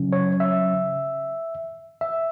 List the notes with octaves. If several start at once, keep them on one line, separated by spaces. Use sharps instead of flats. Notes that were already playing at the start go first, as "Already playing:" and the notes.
Already playing: C#3 F#3 C#4
C#5
E5
E5